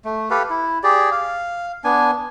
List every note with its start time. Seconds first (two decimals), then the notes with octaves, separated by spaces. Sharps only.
0.05 A3
0.30 G4 A4 B4 F5
0.50 E4
0.84 G4 G#4 D5
1.11 F5
1.84 B3 D4 G#5